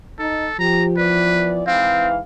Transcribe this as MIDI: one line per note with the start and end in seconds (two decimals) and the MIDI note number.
0.19 0.47 63
0.19 0.57 69
0.59 1.72 53
0.59 0.92 67
0.59 0.84 82
0.97 1.64 52
0.97 1.64 59
0.97 1.54 71
0.97 1.64 74
1.67 2.18 44
1.67 2.18 52
1.67 2.08 60
1.67 2.18 77